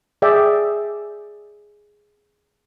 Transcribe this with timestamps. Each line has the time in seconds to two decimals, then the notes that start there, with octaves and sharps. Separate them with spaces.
0.22 G#4 D5 E5 G5